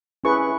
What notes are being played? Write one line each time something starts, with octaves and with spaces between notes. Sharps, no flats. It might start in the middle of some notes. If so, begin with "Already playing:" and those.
C#4 E4 G#4 B4 C#6